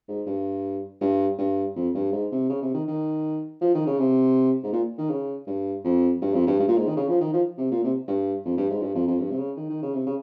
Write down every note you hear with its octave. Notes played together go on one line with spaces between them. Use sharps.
G#2
G2
G2
G2
F2
G2
G#2
C3
C#3
C3
D#3
D#3
F3
D#3
C#3
C3
G#2
A#2
D#3
C#3
G2
F2
G2
F2
G2
G2
A#2
G#2
D#3
C#3
F3
D#3
F3
C3
A#2
C3
G2
F2
G2
G#2
G2
F2
F2
G2
C3
C#3
D#3
D#3
C#3
C3
C#3